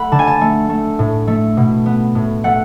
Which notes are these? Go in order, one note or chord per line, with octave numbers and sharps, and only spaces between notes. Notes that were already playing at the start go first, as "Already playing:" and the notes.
Already playing: A3 F#5 B5
D3 A5
G#5
A5
A3
A3
A2
A3
B2
B3
A2
A3 F#5